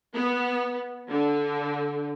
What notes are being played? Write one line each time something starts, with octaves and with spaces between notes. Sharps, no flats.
B3
D3